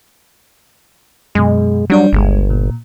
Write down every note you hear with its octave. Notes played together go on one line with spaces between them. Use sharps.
F#2 B2 G#3
F#3 G3 D4 D5
G1 C#2 G#3
A#2